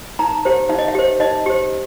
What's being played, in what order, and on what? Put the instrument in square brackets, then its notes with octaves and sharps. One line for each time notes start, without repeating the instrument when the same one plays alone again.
[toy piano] D#4 A#5
G4 C5
D#4 E5
D#5
E5
G4 C5
D#4 D#5
G4 C5